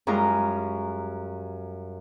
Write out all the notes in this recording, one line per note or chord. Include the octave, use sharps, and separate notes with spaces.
F#2 G3 G#3 F4 A#5 D#6